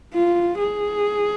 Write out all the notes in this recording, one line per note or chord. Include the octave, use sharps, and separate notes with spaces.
F4
G#4